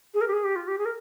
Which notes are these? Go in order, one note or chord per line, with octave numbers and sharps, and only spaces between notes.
G#4
A#4
G4
G#4
G4
F4
G4
G#4
A#4